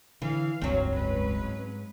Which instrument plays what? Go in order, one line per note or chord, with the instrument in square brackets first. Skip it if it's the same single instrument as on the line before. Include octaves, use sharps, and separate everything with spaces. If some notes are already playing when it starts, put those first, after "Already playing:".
[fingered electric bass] D3 [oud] E3 [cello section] F5
[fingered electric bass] F1 C#2 G2 [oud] F#3 C4
[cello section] G#3 C#4 B4
[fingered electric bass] G#2